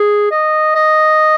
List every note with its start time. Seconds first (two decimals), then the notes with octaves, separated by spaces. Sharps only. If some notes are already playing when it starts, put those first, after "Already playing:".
Already playing: G#4
0.31 D#5
0.75 D#5